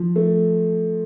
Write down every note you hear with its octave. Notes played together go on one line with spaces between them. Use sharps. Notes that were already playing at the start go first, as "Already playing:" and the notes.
Already playing: F3
A3